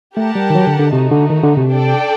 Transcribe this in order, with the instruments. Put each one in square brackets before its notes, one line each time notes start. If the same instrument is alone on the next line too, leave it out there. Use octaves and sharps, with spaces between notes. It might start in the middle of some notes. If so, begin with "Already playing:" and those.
[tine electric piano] A3 [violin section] G4 A#4 F#5 A5
[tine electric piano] G3
D#3
F#3
D3
D3
[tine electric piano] C3 [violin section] A3 D#4 F#4
[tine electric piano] D3
D#3
D3
C3
[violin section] D4 A4 D5 G5